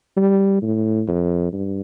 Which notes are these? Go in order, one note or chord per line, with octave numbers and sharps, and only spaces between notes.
G3
A2
F2
G2